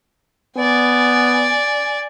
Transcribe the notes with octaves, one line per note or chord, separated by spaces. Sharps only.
B3 D5 G#5